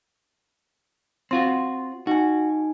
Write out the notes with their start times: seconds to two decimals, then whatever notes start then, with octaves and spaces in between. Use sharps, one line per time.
1.31 C4 F4 F#4 C6
2.07 D#4 F#4 G#5